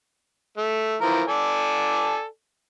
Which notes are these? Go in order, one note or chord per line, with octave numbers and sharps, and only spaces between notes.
A3
E3 F3 A#4
A4 D5 G#5